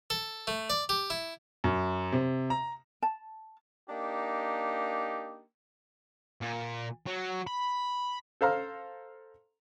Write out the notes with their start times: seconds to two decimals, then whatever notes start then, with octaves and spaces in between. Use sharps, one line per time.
0.10 A4
0.47 A3
0.70 D5
0.89 G4
1.10 E4
1.64 F#2
2.12 C3
2.50 A#5
3.02 A5
3.88 A#3 D4 D#4 G4
6.41 A#2
7.06 F#3
7.47 B5
8.41 A4 C5 F5 A#5 F6